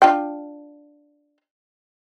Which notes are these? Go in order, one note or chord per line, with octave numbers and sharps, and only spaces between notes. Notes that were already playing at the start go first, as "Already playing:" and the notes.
D4 F4 G5